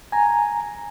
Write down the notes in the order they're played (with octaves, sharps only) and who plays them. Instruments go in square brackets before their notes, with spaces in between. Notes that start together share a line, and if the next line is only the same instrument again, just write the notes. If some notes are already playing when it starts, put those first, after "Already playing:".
[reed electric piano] G#5 A#5